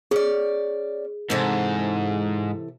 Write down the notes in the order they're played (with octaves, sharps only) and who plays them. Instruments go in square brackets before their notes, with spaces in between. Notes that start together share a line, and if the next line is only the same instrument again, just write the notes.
[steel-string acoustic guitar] C#4 D5 [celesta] G#4
[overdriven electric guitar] G#2 [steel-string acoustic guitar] C3 E3 A4